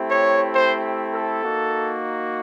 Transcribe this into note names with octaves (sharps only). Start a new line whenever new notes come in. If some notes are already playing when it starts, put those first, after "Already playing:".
Already playing: A3 C4 E4 G4
C#5
C5
A4
A#3 D#4 F#4